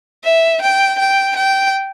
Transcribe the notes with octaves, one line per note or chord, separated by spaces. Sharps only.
E5
G5
G5
G5